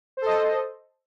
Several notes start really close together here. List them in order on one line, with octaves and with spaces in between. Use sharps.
C5 A4 D#5